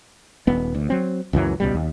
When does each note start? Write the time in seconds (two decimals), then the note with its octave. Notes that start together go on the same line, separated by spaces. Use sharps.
0.47 D#1 B3
0.75 D2
0.90 F#3 C4
1.33 C#2 F#2 E3 F#3
1.60 C#2 B2 G3
1.74 D#2